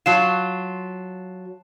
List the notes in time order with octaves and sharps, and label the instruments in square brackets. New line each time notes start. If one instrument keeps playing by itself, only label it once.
[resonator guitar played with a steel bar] F#3 F4 [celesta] A5 C7 E7